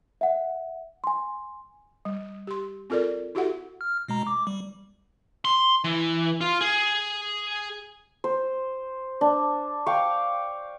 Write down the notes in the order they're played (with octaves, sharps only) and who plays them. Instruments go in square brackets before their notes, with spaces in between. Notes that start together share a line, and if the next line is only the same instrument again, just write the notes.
[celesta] E5 F#5
G#5 C6
[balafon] G3
G4 C6
C4 F4 A4 A#4 D5
E4 F#4 G4 A4 E5 F#5
[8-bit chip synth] F6
B2 G#3 A#5
D6
G3
[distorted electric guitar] C6
E3
F4
G#4
[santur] C5
D4
F5 G5 C#6 D6